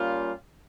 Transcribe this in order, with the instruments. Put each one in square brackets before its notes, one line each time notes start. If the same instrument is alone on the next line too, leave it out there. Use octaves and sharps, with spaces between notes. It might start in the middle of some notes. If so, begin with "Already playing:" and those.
Already playing: [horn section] G3 A#3 C#4 F4